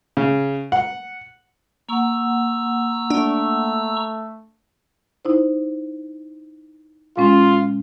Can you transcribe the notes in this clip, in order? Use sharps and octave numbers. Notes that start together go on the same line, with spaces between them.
C#3
F#5
A#3 F#5 A#5 C#6 E6
A3 D4
D#4 E4 C5
A#2 G#3 C#4 F4